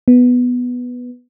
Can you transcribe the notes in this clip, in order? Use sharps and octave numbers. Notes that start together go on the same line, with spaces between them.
B3